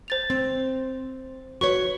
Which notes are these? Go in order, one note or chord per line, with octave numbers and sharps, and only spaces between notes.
C5 A6 F7
C4
F#4 B4 C#5 C#6